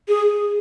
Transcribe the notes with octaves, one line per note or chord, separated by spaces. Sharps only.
G#4